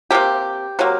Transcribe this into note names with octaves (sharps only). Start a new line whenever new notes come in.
C3 F#3 A#3 G4
C3 F#3 A#3